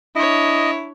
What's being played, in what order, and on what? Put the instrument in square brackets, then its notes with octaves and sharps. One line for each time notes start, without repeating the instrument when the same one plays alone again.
[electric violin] D4 C#5 [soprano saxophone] E4 [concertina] D#5